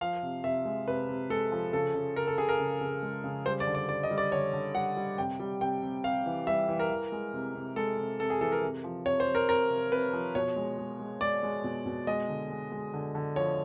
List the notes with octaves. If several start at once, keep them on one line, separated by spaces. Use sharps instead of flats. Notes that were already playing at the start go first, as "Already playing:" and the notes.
F3 F5
C3
C3 E5
G#3
C3 B4
C3
G#3 A4
F3
C#3 A4
C#3
C#3 A#4
A4
C#3 G#4
A#4
C#3
C#3
G#3
C#3
G3 C5
D5
D3
D5
G3 D5
D#5
G3
D5
D3 C#5
D3
G3 F#5
G3
C3 G5
G3
C3 G5
C3
C3 F5
E3
G3 E5
E3
A#4
E3
G#3
C3
C3
G#3 A4
C3
C3 A4
G#4
E3 A4
A#4
C3
F3
C3 C#5
C5
C3
A#4
C3 A#4
C3
C3 B4
F3
B2 C#5
G#3
G#3
G#3
G#3 D5
G#3
B2
B2
G#3 D#5
D3
G#3
G#3
D3
D3
F3 C#5